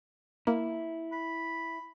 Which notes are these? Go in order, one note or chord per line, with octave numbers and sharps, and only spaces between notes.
A#3 E4
B5